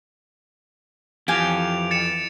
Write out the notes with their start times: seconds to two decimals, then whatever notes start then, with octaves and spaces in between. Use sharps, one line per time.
1.28 F2 E3 G4 F5 G#5 D7 F7
1.91 A6 C#7 E7